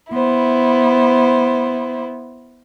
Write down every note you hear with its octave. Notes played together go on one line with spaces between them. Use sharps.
B3 E4 C5